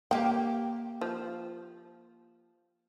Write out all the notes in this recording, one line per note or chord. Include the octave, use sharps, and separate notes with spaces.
A#3 G4 G5
F3